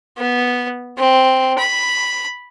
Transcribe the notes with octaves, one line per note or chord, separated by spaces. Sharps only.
B3
C4
B5